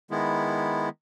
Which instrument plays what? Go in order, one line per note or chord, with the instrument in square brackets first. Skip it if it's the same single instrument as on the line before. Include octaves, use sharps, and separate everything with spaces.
[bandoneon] D#3 G#3 B3 E4